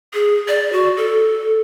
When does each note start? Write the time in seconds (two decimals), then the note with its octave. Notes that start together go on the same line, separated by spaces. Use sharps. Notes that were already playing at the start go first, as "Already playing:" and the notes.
0.14 G#4
0.48 D5
0.73 F#4
0.97 A4